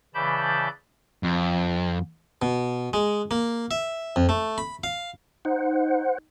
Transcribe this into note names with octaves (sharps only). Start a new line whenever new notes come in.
C#3 E3 D5 A5 B5 G6
F2
B2
G#3
A#3
E5
F2
A3
B5
F5
D#4 C5 F#5